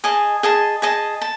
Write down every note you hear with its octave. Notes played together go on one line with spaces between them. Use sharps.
G#4 D#5 A5
G#4 D#5 A5
G#4 D#5 A5
A5